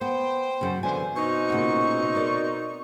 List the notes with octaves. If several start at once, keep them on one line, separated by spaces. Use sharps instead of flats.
B3 C5 G5
F#2 C#3
B2 D3 E3 C5 G#5
B2 C4 D#4 C#6
A#2 C#3 F#4
A#4 D5